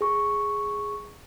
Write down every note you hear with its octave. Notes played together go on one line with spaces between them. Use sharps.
G#4 C#6